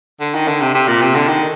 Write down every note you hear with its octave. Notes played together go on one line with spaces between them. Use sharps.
D3
D#3
D3
C3
C3
A#2
C3
D3
D#3